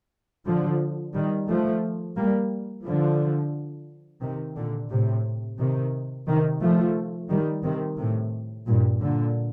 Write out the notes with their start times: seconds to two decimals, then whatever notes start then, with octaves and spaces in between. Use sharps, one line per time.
0.47 D3 F3
1.15 D#3 G3
1.49 F3 A3
2.17 G3 A#3
2.85 D3 F3
4.22 C3 D#3
4.56 A#2 D3
4.91 A2 C3
5.59 C3 D#3
6.28 C3 D#3
6.61 F3 A3
7.30 D#3 G3
7.64 C3 D#3
7.98 A2 C3
8.67 G2 A#2
9.01 A#2 D3